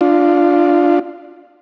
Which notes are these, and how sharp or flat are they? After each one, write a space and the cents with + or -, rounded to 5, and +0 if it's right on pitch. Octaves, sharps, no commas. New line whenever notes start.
D4 +0 F4 +0